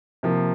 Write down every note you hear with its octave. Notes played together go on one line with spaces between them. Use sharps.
C3 F3 A#3